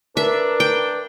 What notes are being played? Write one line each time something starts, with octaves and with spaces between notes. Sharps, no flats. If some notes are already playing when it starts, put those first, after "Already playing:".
D4 A#4 B4 E5
G5